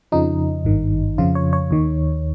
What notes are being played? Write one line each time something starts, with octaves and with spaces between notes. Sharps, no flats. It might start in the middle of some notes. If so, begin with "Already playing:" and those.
F2 C#3 F3 D#4
G#1 G2 D#3
F2 C#3 F3 F4
C#5
C#5
D#2 D#3